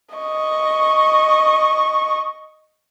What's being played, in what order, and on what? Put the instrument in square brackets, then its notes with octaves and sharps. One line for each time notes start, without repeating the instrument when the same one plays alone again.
[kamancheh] D#5 C#6